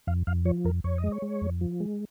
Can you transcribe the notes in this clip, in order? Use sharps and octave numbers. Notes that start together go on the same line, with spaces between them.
F2 F5
F2 F5
F3 C#5
F2 A#4
F2 C#5
D#5
G#3
C#5
G#3
F2
F3
G#3